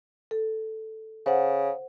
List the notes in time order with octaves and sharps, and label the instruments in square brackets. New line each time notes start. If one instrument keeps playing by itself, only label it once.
[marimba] A4
[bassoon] C#3 [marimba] C5 F#5